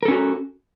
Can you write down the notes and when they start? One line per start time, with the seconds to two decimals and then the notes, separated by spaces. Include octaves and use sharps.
0.03 A#4
0.05 A4
0.08 C#4
0.11 F#4